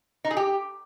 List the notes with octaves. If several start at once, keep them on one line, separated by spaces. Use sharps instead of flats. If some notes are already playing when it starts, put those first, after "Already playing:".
D#4
G#4
G4